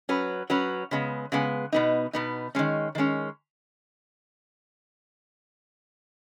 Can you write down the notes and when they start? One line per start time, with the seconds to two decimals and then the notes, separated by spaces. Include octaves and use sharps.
0.09 F#3 C#4 B4
0.50 F#3 C#4 B4
0.91 C#3 G#3 B3
1.32 C#3 G#3 B3
1.72 B2 B3 D#4
2.13 B2 B3 D#4
2.55 D#3 G#3 C#4
2.95 D#3 G#3 C#4